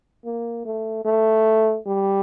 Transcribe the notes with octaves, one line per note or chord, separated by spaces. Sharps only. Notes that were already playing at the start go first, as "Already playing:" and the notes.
A#3
A3
A3
G3